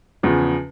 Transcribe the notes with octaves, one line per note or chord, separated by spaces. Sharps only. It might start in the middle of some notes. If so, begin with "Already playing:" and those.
E2 C#3 F3